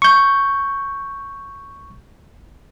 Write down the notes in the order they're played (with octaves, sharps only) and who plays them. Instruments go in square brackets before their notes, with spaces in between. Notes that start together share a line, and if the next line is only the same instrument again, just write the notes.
[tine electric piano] C#6 G6